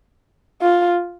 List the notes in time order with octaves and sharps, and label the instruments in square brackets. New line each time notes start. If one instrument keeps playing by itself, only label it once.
[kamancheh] F4